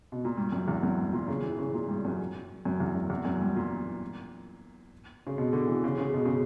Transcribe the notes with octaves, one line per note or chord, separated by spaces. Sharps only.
B2
A#2
G2
F#2
E2
F#2
G2
A#2
C#3
E3
C#3
A#2
G2
F#2
F#2
E2
F#2
E2
F#2
G2
A#2
C#3
B2
D3
E3
C#3
C#3
B2
C#3